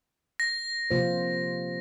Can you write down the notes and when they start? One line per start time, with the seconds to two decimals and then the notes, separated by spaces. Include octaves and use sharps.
0.40 A#6
0.91 C3 F3 A#3 F4 C5